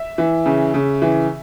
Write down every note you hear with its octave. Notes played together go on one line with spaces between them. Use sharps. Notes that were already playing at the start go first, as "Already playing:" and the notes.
Already playing: E5
E3
C#3
C#3
E3